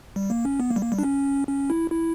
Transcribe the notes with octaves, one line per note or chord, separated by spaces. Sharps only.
G3
A#3
C#4
B3
A#3
G3
A#3
G3
D4
C#4
C#4
E4
E4